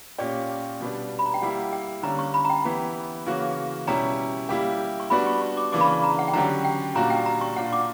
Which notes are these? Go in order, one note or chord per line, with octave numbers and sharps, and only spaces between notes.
A#2 A#3 C#4 G4 D5
B2 G3 B3 D4
B5
A#5
G5
G3 A#3 E4 G4 F#5
G5
D3 G3 A#3 C#4 A#5
C#6
B5
A#5
G5
E3 B3 E4 G4
C#3 E3 A#3 C#4 F#4
B2 G3 C#4 E4 G4 A#5
G3 A#3 E4 G4
C#6
G3 B3 D4 F#4 B5
C#6
C#6
D6
C#3 E3 A#3 D4 D6
B5
C#6
A#5
F#5
G5
D3 F#3 C#4 G4 A#5
G5
A#2 G3 A#3 D4 F#4 A#5
G5
A#5
C#6
A#2 A#3 D4 F#5
D6